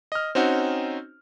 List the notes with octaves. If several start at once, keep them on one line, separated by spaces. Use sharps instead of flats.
D#5 F6
C4 C#4 D#4 F#4